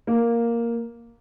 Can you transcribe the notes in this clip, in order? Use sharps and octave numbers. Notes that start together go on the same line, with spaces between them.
A#3